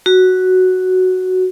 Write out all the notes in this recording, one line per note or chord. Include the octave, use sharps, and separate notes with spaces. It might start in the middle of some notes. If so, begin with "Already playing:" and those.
F#4